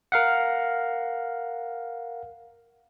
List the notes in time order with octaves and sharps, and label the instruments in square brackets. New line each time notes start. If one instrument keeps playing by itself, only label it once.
[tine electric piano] A#4 F5 F#5